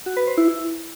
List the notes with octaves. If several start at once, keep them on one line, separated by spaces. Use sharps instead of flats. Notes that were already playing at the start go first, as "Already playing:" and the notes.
F#4
B4
C5
E4
E4